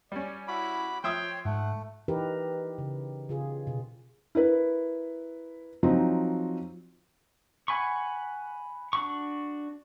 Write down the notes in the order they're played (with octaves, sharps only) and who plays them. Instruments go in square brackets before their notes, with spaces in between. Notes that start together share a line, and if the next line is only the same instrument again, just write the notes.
[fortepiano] G3 C#4 [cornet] D5
[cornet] E4 [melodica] F#4 B5 D6
[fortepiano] F3 E5 D#6 [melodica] C#5 C6 [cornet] G5
[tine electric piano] G#2 [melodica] A3 [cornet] F#5
[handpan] E3 D#4 G4 A#4 B4
C#3
C#3 F4 G#4
B2
[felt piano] E4 A#4 B4
F3 F#3 C4 D#4
[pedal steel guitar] F#5 G#5 B5 C#6
D4 F#4 C#6